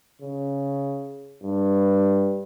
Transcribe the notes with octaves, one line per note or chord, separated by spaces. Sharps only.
C#3
G2